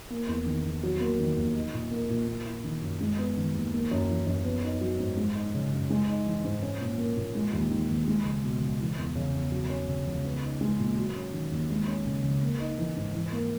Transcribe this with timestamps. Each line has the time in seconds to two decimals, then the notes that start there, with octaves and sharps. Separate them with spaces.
0.10 A#3
0.28 E2
0.46 D#3
0.64 E2
0.83 F#3
1.00 A#3
1.20 D#3
1.37 D#2
1.56 D#4
1.74 A#2
1.91 A#3
2.10 A#2
2.27 A#3
2.46 E4
2.64 D#3
2.81 F#2
3.00 G#3
3.18 B3
3.37 D#3
3.54 D#2
3.73 A#3
3.91 F#2
4.09 E3
4.27 F#2
4.45 B3
4.63 D#4
4.81 F#3
5.00 G#2
5.17 G#3
5.35 D#4
5.54 C#3
5.72 F#2
5.90 G#3
6.08 D#4
6.26 E3
6.44 G#2
6.62 C#4
6.81 A#2
6.98 A#3
7.16 A#2
7.35 G#3
7.53 D#2
7.71 D#3
7.89 D#2
8.07 G#3
8.25 C#2
8.44 B2
8.62 C#2
8.80 E3
8.98 E2
9.15 C#3
9.34 E2
9.52 F#3
9.70 C#4
9.88 C#3
10.07 C#2
10.25 B3
10.43 D#4
10.61 G#3
10.79 A#2
10.97 F#3
11.16 C#4
11.33 D#3
11.52 D#2
11.70 G#3
11.88 C#4
12.06 C#3
12.24 C#2
12.42 A#3
12.60 D#4
12.78 E3
12.96 G#2
13.15 E3
13.32 A#3